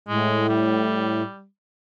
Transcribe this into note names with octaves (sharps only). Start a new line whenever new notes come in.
A2 G#3
G3